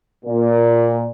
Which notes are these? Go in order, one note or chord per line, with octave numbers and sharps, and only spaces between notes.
A#2